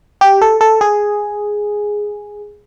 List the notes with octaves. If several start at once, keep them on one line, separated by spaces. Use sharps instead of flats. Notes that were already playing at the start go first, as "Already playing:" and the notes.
G4
A4
A4
G#4